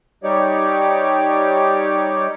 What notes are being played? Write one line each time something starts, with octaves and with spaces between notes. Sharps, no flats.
G3 D#4 G4 C#5 D5